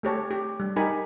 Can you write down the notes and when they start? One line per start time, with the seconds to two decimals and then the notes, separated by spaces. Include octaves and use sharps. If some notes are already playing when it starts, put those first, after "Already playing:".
0.03 A3 G4 C#5 A5
0.31 G4
0.60 G3
0.76 D#4 G4 A#4 G#5 B5